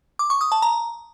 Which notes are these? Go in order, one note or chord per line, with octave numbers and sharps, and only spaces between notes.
D6
C#6
D#6
A5
A#5